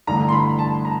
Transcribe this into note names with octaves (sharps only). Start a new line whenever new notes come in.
A1 G2 D3 A#5
C6
B5
A5
A#5